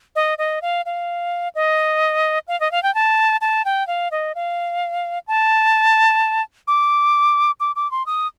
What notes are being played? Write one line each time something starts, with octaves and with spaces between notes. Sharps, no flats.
D#5
D#5
F5
F5
D#5
F5
D#5
F5
G5
A5
A5
G5
F5
D#5
F5
A5
D6
D6
D6
C6
D#6